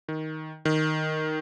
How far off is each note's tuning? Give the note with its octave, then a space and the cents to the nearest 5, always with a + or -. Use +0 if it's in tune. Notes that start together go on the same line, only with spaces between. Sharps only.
D#3 +10
D#3 +0